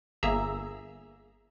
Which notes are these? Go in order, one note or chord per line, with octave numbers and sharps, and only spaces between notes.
G1 A#3 G#4 E5 A#5 E6